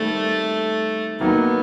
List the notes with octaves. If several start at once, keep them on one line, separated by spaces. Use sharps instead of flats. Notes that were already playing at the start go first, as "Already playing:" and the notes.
Already playing: D#3 G3 A3 C4
D#3 F#3 A#3 B3 D#4